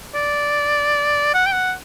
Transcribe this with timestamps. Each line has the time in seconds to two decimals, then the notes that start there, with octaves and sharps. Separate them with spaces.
0.15 D5
1.34 F#5
1.46 G5
1.53 F#5